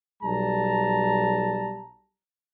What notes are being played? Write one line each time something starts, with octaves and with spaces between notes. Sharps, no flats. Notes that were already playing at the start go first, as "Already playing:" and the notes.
B1 G3 A5 A#5